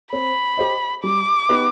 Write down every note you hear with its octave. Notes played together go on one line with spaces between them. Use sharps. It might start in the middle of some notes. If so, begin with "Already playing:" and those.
C4 B5
G4 C5 D#5
G3 D6
B3 D#4 G4 B4